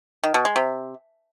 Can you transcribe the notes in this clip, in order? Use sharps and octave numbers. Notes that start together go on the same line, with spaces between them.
D#3
B2
G#3
C3